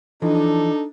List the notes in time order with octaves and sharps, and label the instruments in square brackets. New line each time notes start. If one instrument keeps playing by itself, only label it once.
[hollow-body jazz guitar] E3 F3 [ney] D4 [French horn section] D#4 A4